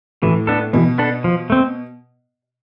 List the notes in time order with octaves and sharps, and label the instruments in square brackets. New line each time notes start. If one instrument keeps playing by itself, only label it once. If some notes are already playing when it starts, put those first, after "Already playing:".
[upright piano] A2 [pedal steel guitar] E3
[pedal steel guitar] B3 D4 A4
[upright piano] B2 [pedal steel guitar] E3
[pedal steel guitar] B3 D4 A4
F3
A3 C4